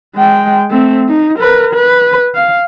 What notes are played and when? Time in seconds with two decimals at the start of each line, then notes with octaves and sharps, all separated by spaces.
0.16 G#3 G5
0.70 A3 C4
1.09 D#4
1.39 A#4 B4
1.74 B4
2.35 F5